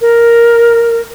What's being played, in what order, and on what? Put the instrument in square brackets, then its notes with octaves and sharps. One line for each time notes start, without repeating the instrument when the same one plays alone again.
[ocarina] A#4